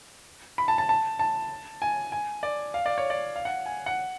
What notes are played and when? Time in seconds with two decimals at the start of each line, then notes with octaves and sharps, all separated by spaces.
0.58 B5
0.68 A5
0.78 A5
0.89 A5
1.19 A5
1.82 G#5
2.12 G#5
2.43 D5
2.74 F5
2.86 D5
2.98 C#5
3.10 D5
3.36 F5
3.45 F#5
3.66 G#5
3.86 F#5